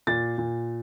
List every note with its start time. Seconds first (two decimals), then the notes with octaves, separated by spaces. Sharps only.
0.07 A#2 A6
0.38 A#2